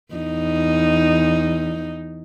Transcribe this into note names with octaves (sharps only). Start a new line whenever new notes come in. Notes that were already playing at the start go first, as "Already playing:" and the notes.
E2 D#4